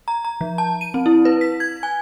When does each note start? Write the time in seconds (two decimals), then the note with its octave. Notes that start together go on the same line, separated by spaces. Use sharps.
0.08 A#5
0.25 A#5
0.41 F3
0.58 A5
0.81 D#7
0.94 C4
1.06 E4
1.25 B4
1.41 B6
1.60 G#6
1.83 G#5